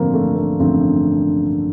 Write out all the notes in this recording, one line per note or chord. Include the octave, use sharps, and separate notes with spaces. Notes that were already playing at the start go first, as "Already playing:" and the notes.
Already playing: A1 G2 D3 F3 A#3 C4
A3
A#3
A1 G2 D3 F3 C4